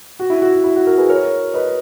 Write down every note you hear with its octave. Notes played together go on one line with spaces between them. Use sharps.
F#4
E4
F#4
F#4
E4
F#4
F#4 A#4
G#4 B4
A#4 C#5
B4 D#5